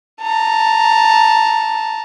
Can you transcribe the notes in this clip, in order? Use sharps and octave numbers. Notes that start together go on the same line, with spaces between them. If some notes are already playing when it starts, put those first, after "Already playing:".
A5 A#5